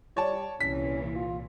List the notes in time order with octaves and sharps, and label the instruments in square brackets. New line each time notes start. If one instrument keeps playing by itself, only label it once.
[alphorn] G3 [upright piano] C#5 D5 A5
[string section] C2 A#2 E3 [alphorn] C#4 [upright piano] B6
[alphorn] F4